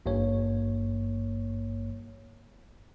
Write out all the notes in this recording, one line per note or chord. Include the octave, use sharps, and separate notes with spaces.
G#1 G2 A#3 C#5